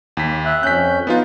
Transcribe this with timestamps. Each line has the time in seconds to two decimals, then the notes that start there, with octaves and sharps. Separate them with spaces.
0.17 D#2 B6
0.46 E5 F#6
0.63 F2 C#4 F#6 G6 B6
1.07 B3 D#4 F4